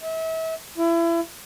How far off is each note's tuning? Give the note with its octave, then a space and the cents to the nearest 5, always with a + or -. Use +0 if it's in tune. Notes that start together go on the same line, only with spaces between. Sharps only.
E5 -35
E4 +30